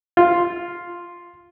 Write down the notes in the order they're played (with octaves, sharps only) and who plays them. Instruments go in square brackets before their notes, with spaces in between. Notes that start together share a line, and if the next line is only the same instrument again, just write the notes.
[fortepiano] F4